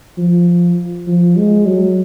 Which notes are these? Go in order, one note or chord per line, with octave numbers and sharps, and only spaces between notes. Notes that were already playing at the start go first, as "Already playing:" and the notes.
F3
F3
G#3
F#3